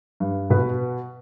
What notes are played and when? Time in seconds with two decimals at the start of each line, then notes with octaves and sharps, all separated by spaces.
0.20 G2
0.50 B2 B4